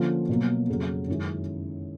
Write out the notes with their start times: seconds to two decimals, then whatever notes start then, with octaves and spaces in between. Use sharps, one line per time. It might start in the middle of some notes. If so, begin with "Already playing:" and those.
Already playing: D3 F3 A#3 C#4 F4
0.29 B2 F#3 A#3
0.69 F2 C#3 F#3
1.08 F#2 D#3 G#3 C#4 E4